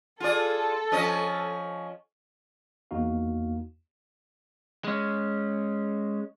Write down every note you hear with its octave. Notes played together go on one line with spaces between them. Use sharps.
F4 G#4 A4 D5
F3 C#4 D#5
E2 A#3 D#4 F#4 F5
G#3 C#4